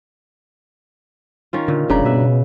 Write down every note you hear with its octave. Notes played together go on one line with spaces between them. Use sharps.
D#3 C#4 F4
A#2 D3
F1 G2 C#3 D4 A#5
B2 B4 E5